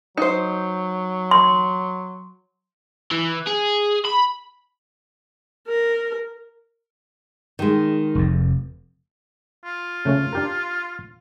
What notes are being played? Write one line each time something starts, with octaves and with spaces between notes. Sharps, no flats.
F#3 D#4 C5
C6
E3
G#4
B5
A#4
D#3 G#3
F1 F2
F4
C#3 A3 C#4
D4 G4 A#4